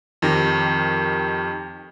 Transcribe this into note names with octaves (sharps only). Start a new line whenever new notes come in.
F2 D#3 G4 A#6